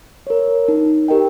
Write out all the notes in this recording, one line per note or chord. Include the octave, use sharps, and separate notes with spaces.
A#4 C#5
D#4
G4 A#4 D#5 G5